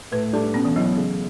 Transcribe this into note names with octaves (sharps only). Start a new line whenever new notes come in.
A2 B4
G3 D4 A4
B2 C#4
E3
F#3 A3 C#4 E4
F#3
C#3